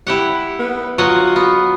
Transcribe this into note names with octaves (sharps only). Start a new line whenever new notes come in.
E4 G4 F#5
B3
F#3 F4 D#5 F#5
B3